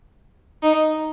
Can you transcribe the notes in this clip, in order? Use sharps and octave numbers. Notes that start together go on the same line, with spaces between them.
D#4